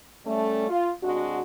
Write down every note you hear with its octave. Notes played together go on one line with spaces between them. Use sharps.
G3 A3 C#4
F4
C3 G#3 D4 F#4